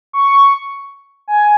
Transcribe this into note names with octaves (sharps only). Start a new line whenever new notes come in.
C#6
G#5